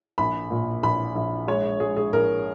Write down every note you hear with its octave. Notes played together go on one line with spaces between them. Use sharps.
A#1 B5
A#2
A#1 B5
A#1
G#3 C#5
G#3 G#4
G#4
A#1 A#4